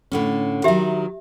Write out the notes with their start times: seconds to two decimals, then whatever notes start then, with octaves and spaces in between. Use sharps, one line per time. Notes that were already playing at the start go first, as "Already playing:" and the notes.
0.12 A2 D3 C#4
0.64 D#3 F#3 G4 E5